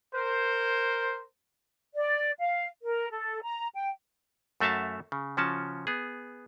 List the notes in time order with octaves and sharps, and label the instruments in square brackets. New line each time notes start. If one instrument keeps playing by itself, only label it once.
[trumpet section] A#4 C5
[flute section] D5
F5
A#4
A4
A#5
G5
[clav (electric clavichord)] F#2 A3 F#4 E5 F5 A5
C#3
C#3 F3 C#4 F#4 A5
B3 G#4